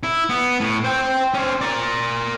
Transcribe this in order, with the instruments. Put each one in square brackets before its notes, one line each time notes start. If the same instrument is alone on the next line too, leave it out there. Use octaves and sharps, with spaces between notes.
[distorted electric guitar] E4
B3
A2
C5 G5
C#4 C5
A#4 D5